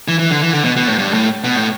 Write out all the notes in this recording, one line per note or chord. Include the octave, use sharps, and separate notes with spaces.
E3
E3
D3
E3
D3
B2
B2
A2
G2
A2
B2
A2